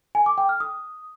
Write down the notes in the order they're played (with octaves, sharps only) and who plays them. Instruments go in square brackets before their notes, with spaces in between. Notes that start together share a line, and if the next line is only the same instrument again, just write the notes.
[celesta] G#5
D6
G5
F6
D#6